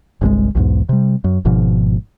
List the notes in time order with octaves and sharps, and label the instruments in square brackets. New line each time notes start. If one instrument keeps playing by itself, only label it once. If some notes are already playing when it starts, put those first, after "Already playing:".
[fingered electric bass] G1 C2 C#3 G#3
B1 E2 G#2
C3 G3
F#2
G#1 G#2 B2 F3